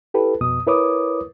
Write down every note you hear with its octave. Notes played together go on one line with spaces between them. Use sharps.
E4 G4 A4 B4
F2 B2 D#6
E4 A#4 B4 C#5 D6 D#6